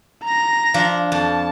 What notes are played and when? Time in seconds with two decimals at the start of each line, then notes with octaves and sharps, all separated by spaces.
0.23 A#5 A#6
0.74 F3 D4 F4
1.12 F2 A5